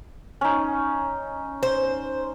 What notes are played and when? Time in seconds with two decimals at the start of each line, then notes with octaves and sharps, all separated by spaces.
0.41 C#4 D#4
1.63 C5